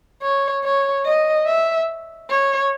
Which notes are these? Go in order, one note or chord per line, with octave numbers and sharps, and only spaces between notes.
C#5
C#5
D#5
E5
C#5